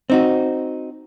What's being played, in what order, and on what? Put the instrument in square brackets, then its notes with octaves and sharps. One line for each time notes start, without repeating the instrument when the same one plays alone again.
[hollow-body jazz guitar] C4 D#4 F#4